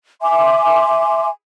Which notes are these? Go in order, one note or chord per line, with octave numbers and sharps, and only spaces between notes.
E5 G#5 C6 D6